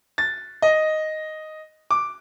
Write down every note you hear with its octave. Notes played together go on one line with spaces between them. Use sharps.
A6
D#5
D6